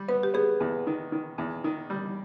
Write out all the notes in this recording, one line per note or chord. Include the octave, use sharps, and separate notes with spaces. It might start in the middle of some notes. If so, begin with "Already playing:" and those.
Already playing: G3
B3 B4
G4
B3 G#4
E2
D#3
D#3
E2
D#3
G3